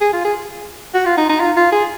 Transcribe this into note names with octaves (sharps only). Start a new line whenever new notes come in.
G#4
F4
G#4
F#4
F4
D#4
D#4
F4
F4
G#4